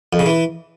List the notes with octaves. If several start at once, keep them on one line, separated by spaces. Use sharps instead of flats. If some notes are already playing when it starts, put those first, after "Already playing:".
F2
C#3
E3